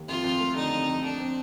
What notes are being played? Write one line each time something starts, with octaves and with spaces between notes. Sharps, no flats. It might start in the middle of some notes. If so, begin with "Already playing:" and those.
Already playing: D#2
F2 F4
F2
A3
D3 D#4
F2
F2
F2 D4
C4